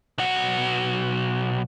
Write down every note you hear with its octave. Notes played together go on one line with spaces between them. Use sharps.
B1 F#4